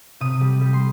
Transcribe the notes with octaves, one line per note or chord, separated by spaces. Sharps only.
C3 D#6
G3
G3
C6